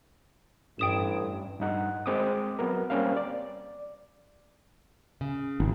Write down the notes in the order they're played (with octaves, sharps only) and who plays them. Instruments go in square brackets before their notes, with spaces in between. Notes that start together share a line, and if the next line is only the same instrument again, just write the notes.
[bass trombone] A1 [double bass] G2 [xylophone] G5 D#6 E7
[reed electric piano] G2 D#4 F#5
G#3 C4 D6 D#6
F#3 B3 A#4
G3 A#3 C4 C#4 A#4 F5
D5
[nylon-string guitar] C#3
[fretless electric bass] G#1